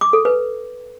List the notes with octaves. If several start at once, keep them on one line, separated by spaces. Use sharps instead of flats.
D6
A4
B4